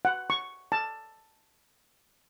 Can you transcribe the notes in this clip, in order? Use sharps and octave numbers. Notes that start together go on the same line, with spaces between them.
F#5
C#6
A5